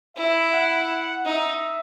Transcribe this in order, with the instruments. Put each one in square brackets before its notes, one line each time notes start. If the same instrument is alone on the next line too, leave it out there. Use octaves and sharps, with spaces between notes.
[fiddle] E4 [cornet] E5
[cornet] F#5
[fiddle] D#4 [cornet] E5